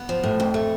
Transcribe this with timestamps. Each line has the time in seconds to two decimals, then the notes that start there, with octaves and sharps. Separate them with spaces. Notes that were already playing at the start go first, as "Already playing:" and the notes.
Already playing: B3
0.09 F3
0.24 A2
0.40 F2
0.54 A3